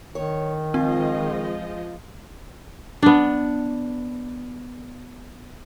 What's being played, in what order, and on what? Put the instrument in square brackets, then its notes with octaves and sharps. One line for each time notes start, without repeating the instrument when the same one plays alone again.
[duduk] D#3 [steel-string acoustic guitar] C#5
[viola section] F3 G#3 D#5 [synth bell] C4 [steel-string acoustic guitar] F4
[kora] B3 D4